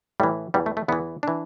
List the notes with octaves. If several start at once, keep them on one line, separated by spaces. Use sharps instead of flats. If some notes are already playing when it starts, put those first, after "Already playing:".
A2 E3 G3
E2 E3 G3
A3
A3
E2 E3 B3
E3 D4